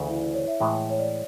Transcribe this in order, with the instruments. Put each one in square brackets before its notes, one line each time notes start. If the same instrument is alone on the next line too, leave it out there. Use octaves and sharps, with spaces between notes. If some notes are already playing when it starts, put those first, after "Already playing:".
Already playing: [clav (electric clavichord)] D2 C#3 E3
[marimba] E4
E4
C#5
E5
[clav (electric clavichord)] A2 E3 G#3 [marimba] E5
[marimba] C#5
D5